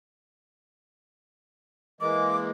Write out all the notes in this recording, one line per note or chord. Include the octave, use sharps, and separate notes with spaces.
E3 G#3 A#3 D6